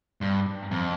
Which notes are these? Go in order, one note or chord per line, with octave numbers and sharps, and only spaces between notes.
G2
F2